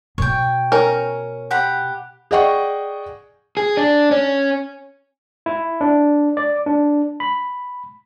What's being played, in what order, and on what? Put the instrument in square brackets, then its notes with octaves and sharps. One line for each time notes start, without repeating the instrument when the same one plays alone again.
[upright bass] B2 [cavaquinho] C#5 G5
[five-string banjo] C#4 A#4
[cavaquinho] G4 F#5 B5
[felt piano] G#4 D5 D#5 F#5 G5 C#6
[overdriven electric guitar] G#4
D4
C#4
[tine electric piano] E4
D4
D5
D4
B5